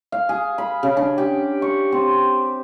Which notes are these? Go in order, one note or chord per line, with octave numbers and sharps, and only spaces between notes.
F5
G#4
B5
C#3
D4
G4
C#6
C4